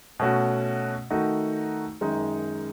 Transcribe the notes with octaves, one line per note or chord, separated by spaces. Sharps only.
B2 A3 C#4 F#4
D#3 A3 D#4 F#4
F#2 D#3 G#3 D#4